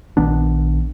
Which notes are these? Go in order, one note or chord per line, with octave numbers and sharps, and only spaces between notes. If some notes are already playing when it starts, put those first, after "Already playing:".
A#1 D#3 B3 D4